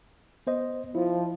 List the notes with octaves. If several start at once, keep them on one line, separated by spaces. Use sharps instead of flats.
B3 C5 D#5
F3 E4